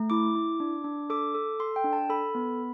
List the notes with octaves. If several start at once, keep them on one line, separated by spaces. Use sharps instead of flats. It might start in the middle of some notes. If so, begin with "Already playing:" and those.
Already playing: A3
E4 D6
E4
D4
D4
A4 D6
A4
A4 C6
G5
D4
A5
A4 B5
B3